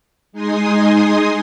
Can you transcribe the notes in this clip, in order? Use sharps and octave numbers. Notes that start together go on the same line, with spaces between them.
G#3 D#4 G#5 C6 D#6